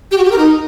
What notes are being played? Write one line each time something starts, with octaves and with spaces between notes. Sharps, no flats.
G4
F#4
G4
A#4
D#4